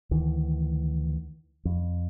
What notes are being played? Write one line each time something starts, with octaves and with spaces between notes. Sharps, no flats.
D2 D#3 E3
F2